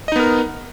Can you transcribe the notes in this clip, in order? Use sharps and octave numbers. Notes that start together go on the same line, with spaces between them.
B3 D#4 A#4 D#5